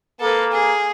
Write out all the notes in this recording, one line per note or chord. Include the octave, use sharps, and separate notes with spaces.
A#3 A4 B4
G#4